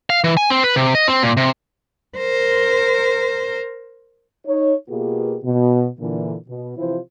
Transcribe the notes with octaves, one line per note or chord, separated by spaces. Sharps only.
F5
E3
G#5
C4
B4
C3
D#5
C4
A#2
C3
A#4 C5
D#4 C#5
B2 A#3 B3 F4 G4 G#4
B2
A#2 D3 E3
B2
C3 E3 F3 E4 F4 C5